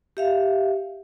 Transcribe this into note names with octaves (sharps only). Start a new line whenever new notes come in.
G4 E5 F5